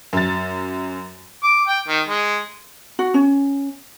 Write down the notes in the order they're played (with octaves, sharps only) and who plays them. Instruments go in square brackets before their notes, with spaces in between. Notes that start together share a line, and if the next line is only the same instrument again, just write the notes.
[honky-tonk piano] F#2 A6
[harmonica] D6
G5
D#3
G#3
[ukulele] F#4
C#4